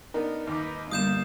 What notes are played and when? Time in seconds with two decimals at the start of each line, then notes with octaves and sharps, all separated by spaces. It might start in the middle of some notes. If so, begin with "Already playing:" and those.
0.14 B3 D4 D#4 A#4
0.47 D#2 D#4 B4 D6
0.92 G1 G3 A#3 F5 D#6 G6 E7